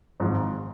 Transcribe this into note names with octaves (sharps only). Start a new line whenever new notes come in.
G#1 G#2 F3